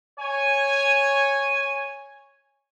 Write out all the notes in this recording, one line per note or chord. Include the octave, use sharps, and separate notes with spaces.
C#5 G#5